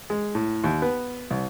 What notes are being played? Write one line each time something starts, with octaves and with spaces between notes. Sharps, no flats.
G#3
A2
D#2
B3
C2